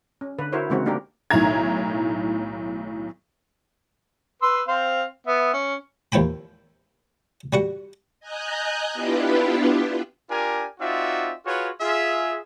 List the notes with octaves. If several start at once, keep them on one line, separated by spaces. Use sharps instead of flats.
C#4
D3 B4
E4 F#4 A#4 C5 C#5
C#3 E3 G#3 C4 D#4 F#4
A3 A#3 D4 D#4 G4 A#4
B1 A2 D#3 E4 A#5 G#6
B4 C6 E6
C4 C5 F5
B3 E5
C#4
D#2 F3 E4 G5 B5
G3 F#4 F#5
D#5 G#5 A#5 F#6 G6
B3 D4 E4 F4 G4 B4
D4 F4 G4 A#4 G#5
C4 D#4 F4 F#4 D5 E5
F4 F#4 G#4 B4 C#5
F4 G#4 E5